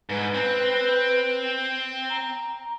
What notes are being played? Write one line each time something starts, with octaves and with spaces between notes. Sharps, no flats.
G#2 B4
C4
A#5